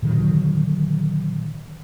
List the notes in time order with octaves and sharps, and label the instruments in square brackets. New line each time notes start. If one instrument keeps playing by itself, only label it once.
[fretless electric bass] A#2 D3 D#3 F#3